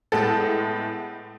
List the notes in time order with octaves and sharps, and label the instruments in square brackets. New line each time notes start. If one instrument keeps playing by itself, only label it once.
[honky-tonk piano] A2 G#3 B3 A4